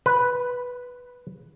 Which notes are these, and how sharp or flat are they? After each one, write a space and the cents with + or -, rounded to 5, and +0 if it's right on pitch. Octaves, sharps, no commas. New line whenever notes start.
B4 -5